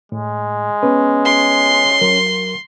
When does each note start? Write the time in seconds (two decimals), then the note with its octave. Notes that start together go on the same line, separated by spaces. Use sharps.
0.12 A2 G#3
0.83 B3 C#4 B4
1.25 C6
2.01 F#3 A#4